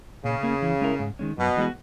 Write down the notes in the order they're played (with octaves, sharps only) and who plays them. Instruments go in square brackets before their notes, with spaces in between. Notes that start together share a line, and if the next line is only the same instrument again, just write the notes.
[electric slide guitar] A#2 [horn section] C#3
[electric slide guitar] A#3 C#4
E3
G#3 C#4 E4 A#4
G#2
D#3 G#3 C#4
[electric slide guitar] F#2 [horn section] B2
[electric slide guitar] E3 G#3 B3 F#4